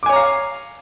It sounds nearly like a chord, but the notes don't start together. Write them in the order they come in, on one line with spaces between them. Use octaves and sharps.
D6 G#5 C#5 A#5 F5